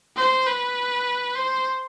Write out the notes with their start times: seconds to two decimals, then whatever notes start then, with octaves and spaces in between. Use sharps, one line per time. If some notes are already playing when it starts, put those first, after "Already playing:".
0.17 C5
0.46 B4
1.35 C5